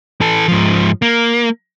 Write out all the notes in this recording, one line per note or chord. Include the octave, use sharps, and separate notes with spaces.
E3 A4
G#2 F3
A#3